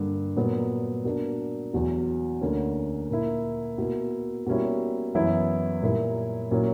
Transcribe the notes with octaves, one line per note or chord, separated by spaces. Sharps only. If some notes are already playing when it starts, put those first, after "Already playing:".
Already playing: G2 D3 A#3
A#2 F#3 B3
B2 A#3 D4
E2 B2 F#3
D2 D3 A#3 C#4
A#2 A#3 E4
B2 A#3 E4
B2 G3 A#3 C#4 E4
F#2 E3 B3 E4
A#2 G3 A#3 E4
A#2 F#3 C#4 E4